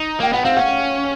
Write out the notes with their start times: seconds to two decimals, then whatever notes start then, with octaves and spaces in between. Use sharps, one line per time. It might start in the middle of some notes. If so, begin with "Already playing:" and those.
Already playing: D#4
0.20 A#3 G5
0.33 B3 F#5
0.45 C4 F5
0.57 C#4 F#5